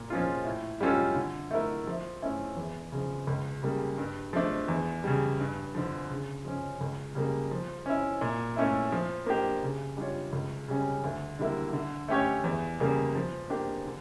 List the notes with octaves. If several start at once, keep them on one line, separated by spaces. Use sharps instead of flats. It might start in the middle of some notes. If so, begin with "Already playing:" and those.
Already playing: A#2
F3 C#4 F4
A2
G3 C#4 F4 A4
D3
A3 E4 A#4
F3
A3 C#4 E4
E2
C#3 F3
C#2
C#3 G3 A#3
G2
F3 A3 D4
E2
C#3 G3
G2
D3 F3
C#3
F3 C#4
C#2
C#3 G3 A#3
F3
C#4 E4
A#2
A3 C#4 E4
F3
A#3 D4 G4
C#3
G3 D4 F4 C#5
C#2
C#3 G3 C#4
D2
D3 G3 A#3 E4
D3
A3 C#4 G4 C#5
E2
C#3 G3 A#3
F3
A#3 D4 G4
D3